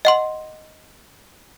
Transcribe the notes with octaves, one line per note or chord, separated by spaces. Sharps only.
D#5 F#5 C6